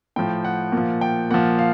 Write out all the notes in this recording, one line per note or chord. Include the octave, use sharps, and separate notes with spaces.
A2 F3 G5
F#5
A#2 F3
G5
A#2 F3 F#5
F5